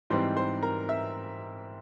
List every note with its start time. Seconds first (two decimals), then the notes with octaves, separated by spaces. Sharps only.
0.10 G#2 E3 G3 C4 D#4 C5 C6
0.37 C5 C6
0.63 A#4 A#5
0.89 E5 E6